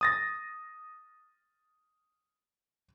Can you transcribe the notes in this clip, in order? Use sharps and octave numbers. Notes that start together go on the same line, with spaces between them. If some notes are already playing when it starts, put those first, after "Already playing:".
D#6 A6 A#6